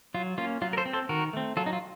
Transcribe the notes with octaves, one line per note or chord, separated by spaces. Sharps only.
F#3 F4
A#3 C#4 F4
F#3 F4
A#4
A4 C5
C4
A4 C5
D#3 F#4 A#4
A3 C4
F#3 F4 A4
D#4
F4